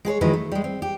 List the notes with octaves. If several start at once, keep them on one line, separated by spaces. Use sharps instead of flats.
G#3 G#4 B4 C#5
D#3 F3 F#3 G#3 E4 B4
A3
G3 G#3
C4
G4